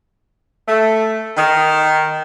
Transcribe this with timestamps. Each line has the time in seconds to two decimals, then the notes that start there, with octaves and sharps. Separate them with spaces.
0.68 A3
1.37 D#3